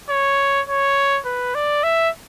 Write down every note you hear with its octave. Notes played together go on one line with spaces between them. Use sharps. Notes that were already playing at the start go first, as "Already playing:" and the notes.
C#5
C#5
B4
D5
E5